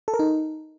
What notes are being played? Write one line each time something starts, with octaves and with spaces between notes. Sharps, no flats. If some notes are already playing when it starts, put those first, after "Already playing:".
A4
A#4
D#4